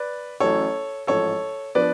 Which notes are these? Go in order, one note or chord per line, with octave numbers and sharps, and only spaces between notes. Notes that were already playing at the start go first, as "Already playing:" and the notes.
Already playing: B4 D5
A1 A2 F#3 C#4 A4 C#5
A1 G#2 F3 A4 C#5
F3 B3 D4 B4 D5